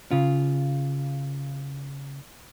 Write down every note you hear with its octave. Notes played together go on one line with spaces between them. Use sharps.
C#3 F4